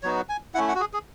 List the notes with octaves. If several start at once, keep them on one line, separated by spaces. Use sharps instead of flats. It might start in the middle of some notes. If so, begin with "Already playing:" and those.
F#3 B3 D#4 F#4 C#5
G#5
A3 C#4 E4 F#5
F#5
F#4
G#4
G#4